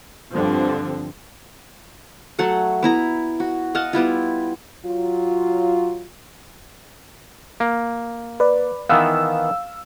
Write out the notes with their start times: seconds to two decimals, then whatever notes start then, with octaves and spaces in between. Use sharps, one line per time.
0.32 G2 D3 F3 C4
2.39 F#3 A3 A4 F#5
2.83 B3 E4 A#5
3.40 F#4
3.75 D#5 F5 F#5 A5
3.93 G3 B3 E4 F4
4.85 F#3 F4
7.60 A#3
8.40 B4 D5
8.89 D#3 E3 B3 F5 E6